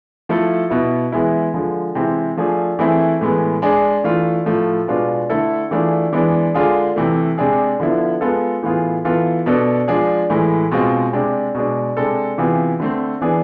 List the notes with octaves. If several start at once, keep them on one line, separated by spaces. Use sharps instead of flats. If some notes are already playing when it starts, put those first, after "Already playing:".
F3 A3 E4 A4
B2 B3 E4
E3 G#3 B3 E4
D3 F3 G#3
C3 E3 G#3 C4 E4
F3 A3 D4 G#4
E3 A3 C4 E4 G#4
A2 E3 G#3 B3
G#3 D4 G#4
E3 A3 D4 F4
A2 F3 A3
B2 G#3 B3 D4 F4
D3 A3 E4 A4
E3 A3 D4 F4 G#4
E3 G#3 B3 D4
D3 G#3 D4 F4 G#4
C3 E3 A3
C3 G#3 D4 G#4
D3 F3 B3 E4
G#3 B3 F4 A4
A2 E3 B3 F4 G#4
E3 B3 F4 A4
B2 B3 D4 A4
F3 G#3 D4 G#4
A2 E3 G#3
B2 G#3 C4 F4
C3 G#3 D4
B2 G#3 D4
C3 G#3 D4 A4
C3 E3 B3 F4 G#4
D3 A3 C4
E3 B3 D4 G#4